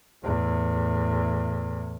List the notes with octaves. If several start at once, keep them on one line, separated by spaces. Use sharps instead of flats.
E2 A2